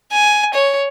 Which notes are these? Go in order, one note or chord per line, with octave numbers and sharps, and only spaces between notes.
G#5
C#5